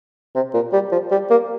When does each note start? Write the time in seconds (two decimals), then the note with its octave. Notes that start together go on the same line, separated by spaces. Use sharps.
0.35 C3
0.54 A#2
0.73 G3
0.92 F3
1.11 G3
1.30 A#3